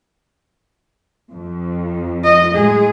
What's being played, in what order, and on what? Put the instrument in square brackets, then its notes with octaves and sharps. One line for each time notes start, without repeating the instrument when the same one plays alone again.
[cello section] F2
[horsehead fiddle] D#5
[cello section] A2 F#3 G#3 [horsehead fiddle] G#4